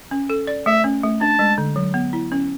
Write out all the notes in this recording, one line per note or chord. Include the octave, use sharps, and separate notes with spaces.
C#4
A4
D5
A3 E5
C#4
A3
D4 A5
G#3
D3
F#3
B3
E4
C#4